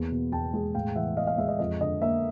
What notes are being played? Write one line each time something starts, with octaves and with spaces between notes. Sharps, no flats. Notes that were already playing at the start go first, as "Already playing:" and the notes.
Already playing: E2 A#3
B2
E2 G5 A5
G#3
A2 F5 G5
E3 E5 F#5
B3 D#5 F5
D#5 F5
G#3 E5
D#5
F2 D#5
D3 D#5
A#3 E5